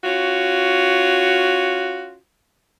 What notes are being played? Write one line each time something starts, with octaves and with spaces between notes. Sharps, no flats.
C#4 F4 F#4